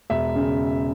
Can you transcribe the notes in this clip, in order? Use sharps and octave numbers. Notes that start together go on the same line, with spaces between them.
E1 E5
C#3